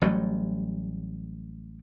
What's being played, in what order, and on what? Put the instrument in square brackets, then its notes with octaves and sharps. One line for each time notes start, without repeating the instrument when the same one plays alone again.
[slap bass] A1 F#3 G3 A3